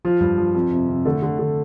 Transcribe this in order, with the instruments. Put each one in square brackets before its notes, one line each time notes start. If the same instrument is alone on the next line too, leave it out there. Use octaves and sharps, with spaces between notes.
[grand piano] F3 F4
G2
F3
F2
C3
C3
D3 A3 A4
D3
D3